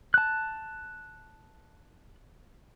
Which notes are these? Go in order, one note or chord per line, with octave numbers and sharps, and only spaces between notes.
A5 F#6